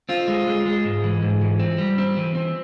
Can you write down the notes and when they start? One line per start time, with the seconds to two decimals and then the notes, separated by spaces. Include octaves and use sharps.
0.09 C4 F4
0.28 G#3
0.47 G#3
0.66 G#3
0.85 G#2
1.04 E3
1.22 G#2
1.41 E3
1.60 C4
1.78 G3
1.98 C4
2.17 E3
2.35 C4